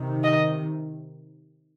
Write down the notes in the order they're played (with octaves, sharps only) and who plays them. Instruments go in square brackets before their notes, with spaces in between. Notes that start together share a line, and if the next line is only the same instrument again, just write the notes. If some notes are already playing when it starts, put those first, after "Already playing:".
Already playing: [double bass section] C3 D#3
[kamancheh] D#5